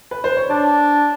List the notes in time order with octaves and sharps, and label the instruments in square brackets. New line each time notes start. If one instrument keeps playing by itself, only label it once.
[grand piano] B4
C5
C#5
[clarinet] D4 [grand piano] D5